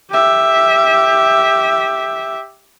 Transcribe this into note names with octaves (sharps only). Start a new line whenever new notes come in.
G4 E5